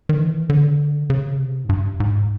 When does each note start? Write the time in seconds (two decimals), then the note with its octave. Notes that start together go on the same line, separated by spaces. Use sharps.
0.09 D#3
0.18 E3
0.50 D3
1.10 C#3
1.39 C3
1.65 G#2
1.69 G2
2.00 G#2